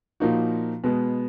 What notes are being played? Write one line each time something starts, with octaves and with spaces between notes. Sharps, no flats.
A#2 F3 A#3 D#4 F#4
B2 G#3 B3